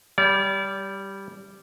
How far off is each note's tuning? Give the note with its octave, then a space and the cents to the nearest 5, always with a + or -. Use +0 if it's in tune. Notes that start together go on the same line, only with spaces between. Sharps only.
G3 +0 D5 -35